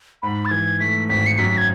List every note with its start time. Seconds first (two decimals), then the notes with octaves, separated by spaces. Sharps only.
0.22 G#2 B5
0.45 A6
0.51 E3 G#6
0.80 A3 B6
1.09 G#1 B6
1.27 C#7
1.38 F#2 B6
1.57 G#6